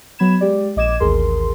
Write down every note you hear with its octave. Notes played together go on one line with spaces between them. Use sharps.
F#3 B3 B5 G#6 E7
G#3 G4 D5
A#1 D#5 D6 G#6 E7
A1 D#2 G#4 A#4 C6